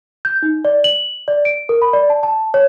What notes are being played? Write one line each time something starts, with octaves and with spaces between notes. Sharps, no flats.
G6
D#4
D5
F#7
D5
D7
A#4
B5
D5
A5
A5
C#5